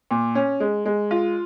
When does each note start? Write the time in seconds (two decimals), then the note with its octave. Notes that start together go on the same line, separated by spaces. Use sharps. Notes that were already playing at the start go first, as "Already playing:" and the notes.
0.11 A#2
0.35 C#4
0.60 G#3
0.85 G#3
1.11 F4